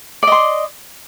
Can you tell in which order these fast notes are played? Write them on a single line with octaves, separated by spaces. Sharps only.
D5 D#5 C6